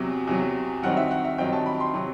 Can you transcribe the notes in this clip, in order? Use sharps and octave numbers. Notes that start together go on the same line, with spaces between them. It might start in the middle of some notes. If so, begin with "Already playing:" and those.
Already playing: E2 C3 F#3
E2 C3 F#3
G2 D#3 F#3 C4 D#4 F#5
E5
F#5
E5
G2 D#3 F#3 C4 D#4 G5
A5
B5
C6
C3 F#3